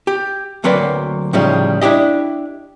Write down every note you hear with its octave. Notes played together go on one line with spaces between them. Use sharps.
G4
D2 F#3 A#3 C4 B4 D5
A2 C#3 F3 G3 D#4
D4 E4 G4 D#5